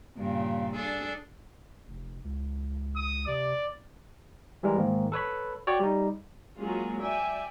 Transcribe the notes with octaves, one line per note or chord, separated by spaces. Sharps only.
G2 A#2 C#3
D4 G#4 A4
F1
C#2
D#6
C3 D5
E3 G3 G#3 A#4
G#2 D#3 A#3
A4 B4 C#5 B5
F#4 C#5 D5 G5
G3 D#4
F#3 G#3 A#3 C#4 F4 G#4
D5 E5 G5 G#5